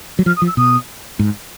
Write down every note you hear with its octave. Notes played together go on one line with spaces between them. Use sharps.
F#3
F3 F6
D#6
F3
E6
B2 D#6
G#2